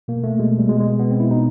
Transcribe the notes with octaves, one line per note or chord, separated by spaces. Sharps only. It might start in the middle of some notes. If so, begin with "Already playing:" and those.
B2 A#3
A3
B2 G#3
G3
B2 G#3
G#3
B2 B3
C4
E4
B2 D#4